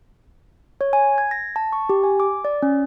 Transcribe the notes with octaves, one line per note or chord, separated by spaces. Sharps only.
C#5
G#5
G#6
A#6
A5
C#6
G4
G#5
D6
D5
C#4